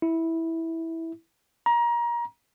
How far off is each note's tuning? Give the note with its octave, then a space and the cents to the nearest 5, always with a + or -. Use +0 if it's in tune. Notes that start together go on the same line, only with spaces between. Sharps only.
E4 -10
A#5 +25